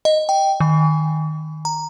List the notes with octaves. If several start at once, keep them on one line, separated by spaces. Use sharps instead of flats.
D#5
G5
D#3
A#5